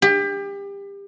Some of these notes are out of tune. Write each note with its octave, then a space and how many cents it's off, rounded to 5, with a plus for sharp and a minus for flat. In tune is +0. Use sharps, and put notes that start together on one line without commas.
G4 +30